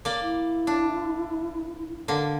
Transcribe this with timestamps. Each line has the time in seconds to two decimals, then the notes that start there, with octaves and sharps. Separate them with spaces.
0.05 A#3 D5
0.22 E4
0.67 D4
2.08 D3 A#3